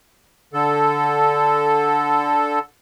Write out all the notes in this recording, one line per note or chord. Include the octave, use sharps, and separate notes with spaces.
D3 A4